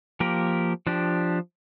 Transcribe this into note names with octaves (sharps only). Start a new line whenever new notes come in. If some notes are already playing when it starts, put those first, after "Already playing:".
F3 A#3 G4 A#4
F3 D4 G4